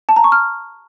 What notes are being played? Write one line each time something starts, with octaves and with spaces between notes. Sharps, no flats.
A5
A#5
C#6
F6